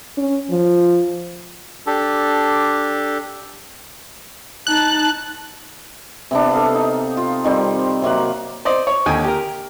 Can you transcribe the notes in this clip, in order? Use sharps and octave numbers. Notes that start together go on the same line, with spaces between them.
C#4
F3
D4 G4 A4
D#4 A5 F#6
C3 B3 D4
A4 D#5 F5
D#4
F4
D#3 G3 C4
C3 F#3 A#3 F#5
C5 D5 D#5
C#5
D#2 D3 G5 G#5 D#6
G4 A#4